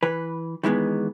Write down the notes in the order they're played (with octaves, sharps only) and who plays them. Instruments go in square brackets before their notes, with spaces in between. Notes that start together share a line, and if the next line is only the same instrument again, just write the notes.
[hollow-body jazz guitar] E3 B4
D#3 E3 G#3 B3